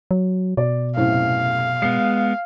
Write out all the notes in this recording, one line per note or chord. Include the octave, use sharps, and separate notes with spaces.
F#3
B2 D5
F#2 A2 C3 F5
G#3 B3 C7